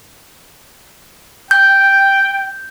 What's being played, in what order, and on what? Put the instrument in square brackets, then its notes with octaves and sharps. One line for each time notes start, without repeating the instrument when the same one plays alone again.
[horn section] G5 [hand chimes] G6